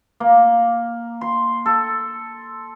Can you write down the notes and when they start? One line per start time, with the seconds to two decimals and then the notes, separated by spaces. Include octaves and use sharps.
0.20 A#3
1.21 C6
1.66 A4